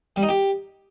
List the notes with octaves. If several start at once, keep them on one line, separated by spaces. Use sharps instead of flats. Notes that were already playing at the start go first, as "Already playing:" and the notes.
G3
D#4
G4